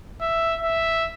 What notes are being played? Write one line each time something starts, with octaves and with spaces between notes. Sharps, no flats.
E5
E5